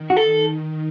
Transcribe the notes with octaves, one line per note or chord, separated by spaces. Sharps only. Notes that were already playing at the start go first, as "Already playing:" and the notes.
Already playing: D#3
F#4
A4